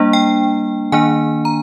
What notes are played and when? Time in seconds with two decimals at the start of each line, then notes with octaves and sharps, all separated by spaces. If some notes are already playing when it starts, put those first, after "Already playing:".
Already playing: G3 A#3 D4
0.13 G5
0.92 D#3 A#3 D4 G#5
1.45 A#5